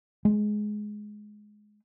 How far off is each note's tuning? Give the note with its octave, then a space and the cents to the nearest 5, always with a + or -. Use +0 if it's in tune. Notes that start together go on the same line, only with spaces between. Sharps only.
G#3 +15